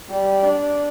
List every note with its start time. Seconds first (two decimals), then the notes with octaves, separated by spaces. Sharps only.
0.10 G3
0.43 D4